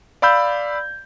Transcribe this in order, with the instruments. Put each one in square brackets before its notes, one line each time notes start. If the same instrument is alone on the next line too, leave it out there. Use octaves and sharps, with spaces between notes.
[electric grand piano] D5 F5 B5 E6 G6